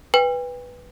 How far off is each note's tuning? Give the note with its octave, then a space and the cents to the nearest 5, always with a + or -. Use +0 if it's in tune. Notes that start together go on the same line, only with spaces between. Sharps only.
B4 +0 G5 +40